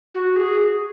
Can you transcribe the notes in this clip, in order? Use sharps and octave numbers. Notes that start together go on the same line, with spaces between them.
F#4
G#4